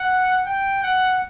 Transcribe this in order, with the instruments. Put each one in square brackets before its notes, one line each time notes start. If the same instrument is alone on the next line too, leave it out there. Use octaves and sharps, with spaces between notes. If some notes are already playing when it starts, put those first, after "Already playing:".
Already playing: [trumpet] F#5
G5
F#5